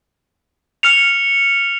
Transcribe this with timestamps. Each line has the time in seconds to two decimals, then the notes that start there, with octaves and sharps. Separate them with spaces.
0.83 F6 C#7 F7